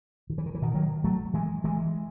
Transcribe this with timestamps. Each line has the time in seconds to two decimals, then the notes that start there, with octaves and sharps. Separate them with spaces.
0.30 D#3
0.38 E3
0.46 D#3
0.55 E3
0.62 B2 D#3
0.74 D#3 F#3
1.04 F#3 A3
1.34 E3 G#3
1.64 E3 G#3